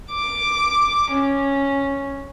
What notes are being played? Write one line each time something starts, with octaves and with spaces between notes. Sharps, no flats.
D6
C#4